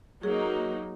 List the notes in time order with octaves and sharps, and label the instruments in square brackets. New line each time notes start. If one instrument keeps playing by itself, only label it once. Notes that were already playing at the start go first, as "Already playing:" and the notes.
[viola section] F#3 A#3 D#4 [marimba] G#4